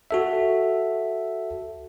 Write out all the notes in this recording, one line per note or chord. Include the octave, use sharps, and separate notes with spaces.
F#4 A4 E5